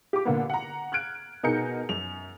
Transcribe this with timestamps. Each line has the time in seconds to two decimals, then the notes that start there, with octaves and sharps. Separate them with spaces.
0.13 G4 D6
0.25 A#2 D3 A#3 B3
0.50 F#5 A#5
0.92 F6 F#6 G#6 D7
1.43 B2 D#4 G#4 A#4 G6 C#7
1.89 F#2 F7